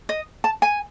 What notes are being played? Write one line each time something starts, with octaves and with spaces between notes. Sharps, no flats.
D#5
A5
G#5